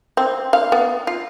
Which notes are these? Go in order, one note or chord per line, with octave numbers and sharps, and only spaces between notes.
C4
F5
B3
F4